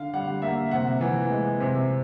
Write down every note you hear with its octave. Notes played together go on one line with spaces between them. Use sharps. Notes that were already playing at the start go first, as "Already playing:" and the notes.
Already playing: D3 F5
G3 F#5
A#3 E5
C3 F#5
E3
G#3
C3